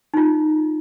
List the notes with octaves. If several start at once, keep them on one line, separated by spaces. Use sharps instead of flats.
D#4 F4